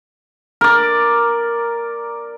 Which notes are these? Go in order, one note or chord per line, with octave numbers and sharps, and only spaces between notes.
A#4 D5